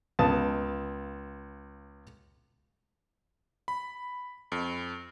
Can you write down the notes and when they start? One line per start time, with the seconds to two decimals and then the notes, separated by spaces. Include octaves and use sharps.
0.19 C#2 B3 F5 A5 D#6
3.68 B5
4.52 F2